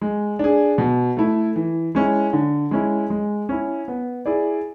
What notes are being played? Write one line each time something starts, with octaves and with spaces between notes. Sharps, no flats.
G#3
D4 G#4
B2
A3 E4
E3
G#3 C#4 E4
D3
G#3 C#4 E4
G#3
C#4 E4
B3
E4 G#4 D5